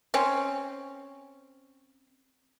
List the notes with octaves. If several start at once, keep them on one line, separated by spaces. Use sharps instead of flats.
C4 C#4